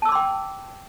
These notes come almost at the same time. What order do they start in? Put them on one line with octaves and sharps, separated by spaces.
A5 E6 D6 C6 G5